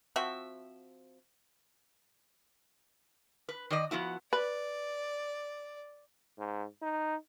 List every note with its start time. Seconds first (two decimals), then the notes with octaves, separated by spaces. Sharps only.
0.16 F3 C4 F#4 E5
3.49 B4
3.70 D#3 D5 D#5
3.91 F3 B3 E4 F#4
4.33 B4 D5
6.38 G#2
6.82 D#4